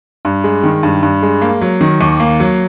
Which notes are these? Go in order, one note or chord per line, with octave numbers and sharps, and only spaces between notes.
G2
G#3
D#3
G2
G2
G#3
A#3
F#3
D#3
D#2
A#3
F#3